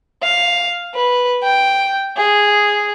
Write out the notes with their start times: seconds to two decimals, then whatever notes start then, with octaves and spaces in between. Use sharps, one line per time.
0.23 F5
0.95 B4
1.43 G5
2.17 G#4